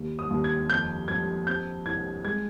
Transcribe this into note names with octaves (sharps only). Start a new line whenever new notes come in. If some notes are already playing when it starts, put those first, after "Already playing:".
Already playing: D#2
D#6
D#2
G#6
F2 G6
F2 G#6
C4 G6
C2 G#6
G#3 G#6